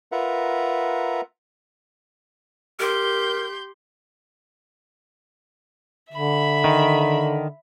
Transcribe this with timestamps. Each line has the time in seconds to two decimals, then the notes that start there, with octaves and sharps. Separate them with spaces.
0.12 F4 A#4 B4 E5 F#5 A#5
2.80 G4 A#4 C6 G6
6.13 D3 E5 B5
6.64 D#3